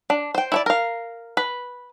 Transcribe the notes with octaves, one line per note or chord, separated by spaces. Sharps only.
D4
C5 G5
E4 C#5 D5
A#4 F5
B4